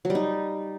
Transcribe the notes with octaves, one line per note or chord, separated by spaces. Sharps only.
F#3
G3
D#4